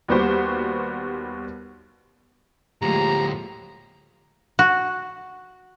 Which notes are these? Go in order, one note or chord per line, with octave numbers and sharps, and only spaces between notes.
D#2 G3 B3 F#4 G4 C5
D2 A2 F3 G#3 A#3 G4 A#5
F#4